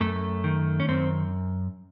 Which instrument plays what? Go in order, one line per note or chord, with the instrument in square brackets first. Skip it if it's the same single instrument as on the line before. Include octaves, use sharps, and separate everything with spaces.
[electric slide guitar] F#2 A3
D#3
C#4
F#2 C4